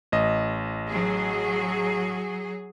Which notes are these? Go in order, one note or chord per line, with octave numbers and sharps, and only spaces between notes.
A1 D#5
F#3 G#4